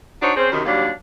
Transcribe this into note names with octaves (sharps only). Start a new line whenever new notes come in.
D4 D#4 F#4 C5 C#5
C4 C#4 G#4 C5
F#2 C3 D#3
D#2 F#3 G3 D4 F5